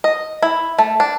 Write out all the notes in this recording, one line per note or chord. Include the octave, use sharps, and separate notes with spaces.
D#5
E4
A3
D4